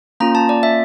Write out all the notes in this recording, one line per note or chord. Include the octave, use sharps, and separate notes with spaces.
A#3 C#4 F4 A#5
A5
D5
E5